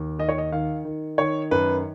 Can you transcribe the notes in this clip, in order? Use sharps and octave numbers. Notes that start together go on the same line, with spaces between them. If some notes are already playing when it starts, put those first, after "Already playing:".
Already playing: D#2
D#3 D#5
C#5
D#5
D#3 F5
D#3
D#3 C#5
F#2 B4